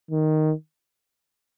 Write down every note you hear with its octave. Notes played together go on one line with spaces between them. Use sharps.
D#3